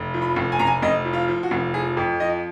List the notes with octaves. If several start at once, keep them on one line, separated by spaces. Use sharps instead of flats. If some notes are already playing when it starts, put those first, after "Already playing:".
Already playing: F1
F3
B5
F1
G#5
F1 A#5
G#5
F1 D#5
F3
F4
F3
F#4
F1
F3 G#4
F2
F3 D#5